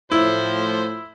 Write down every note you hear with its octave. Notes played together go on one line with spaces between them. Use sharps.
A2 F3 E4 C5